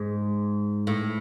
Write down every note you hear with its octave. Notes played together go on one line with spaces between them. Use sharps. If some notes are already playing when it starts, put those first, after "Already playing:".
Already playing: G#2
A2